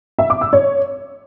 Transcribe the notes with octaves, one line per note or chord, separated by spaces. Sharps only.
E5
D6
E6
C#5